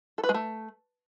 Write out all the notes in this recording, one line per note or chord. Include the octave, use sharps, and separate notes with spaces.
A4
B4
G#3
A3